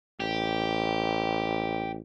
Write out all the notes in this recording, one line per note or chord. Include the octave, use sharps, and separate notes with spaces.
A1 G4